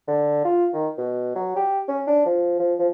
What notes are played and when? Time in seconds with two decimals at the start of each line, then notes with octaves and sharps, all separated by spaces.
0.08 D3
0.45 F4
0.74 D#3
0.98 B2
1.35 F#3
1.56 G4
1.88 C#4
2.07 D4
2.26 F3
2.60 F3
2.79 F3